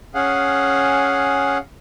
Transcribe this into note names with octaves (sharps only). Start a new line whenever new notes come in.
C#4 G#4 F5 F#5